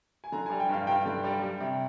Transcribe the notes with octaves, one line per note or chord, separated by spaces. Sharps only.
G#5
D3 A#5
G3 G#5
G5
G2 F5
G2 G5
D3
G3
G3
C3